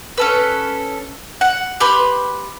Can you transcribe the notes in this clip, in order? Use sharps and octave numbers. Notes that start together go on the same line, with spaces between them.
C#4 A4 B4
F#5
G4 B4 B5 C6